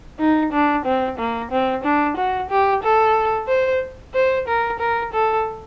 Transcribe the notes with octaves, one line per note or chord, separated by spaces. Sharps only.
D#4
D4
C4
A#3
C4
D4
F#4
G4
A4
C5
C5
A#4
A#4
A4